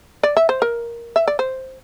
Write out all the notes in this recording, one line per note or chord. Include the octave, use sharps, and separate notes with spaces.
D5
E5
C5
A#4
E5
D5
C5